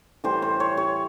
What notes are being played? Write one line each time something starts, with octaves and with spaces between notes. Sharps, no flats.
A2 E3 G3 C5
C5
C#5
C#5